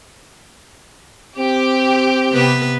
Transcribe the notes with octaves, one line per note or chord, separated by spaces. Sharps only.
C4 G4
C3 B3 B4